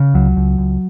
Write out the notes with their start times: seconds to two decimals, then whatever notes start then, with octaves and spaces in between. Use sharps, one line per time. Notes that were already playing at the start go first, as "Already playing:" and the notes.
Already playing: C#3
0.14 C#2 F#3
0.36 C#2
0.58 C#2